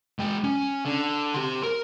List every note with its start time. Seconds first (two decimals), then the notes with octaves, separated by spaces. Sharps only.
0.19 G#3 G5
0.44 C#4
0.85 D3
1.34 G4 C6
1.63 A#4